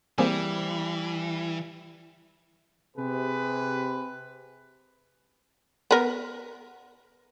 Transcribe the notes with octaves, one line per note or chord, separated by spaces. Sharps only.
E3 G3 A#3 C4 G#4
C3 G#4 B4
B3 A#4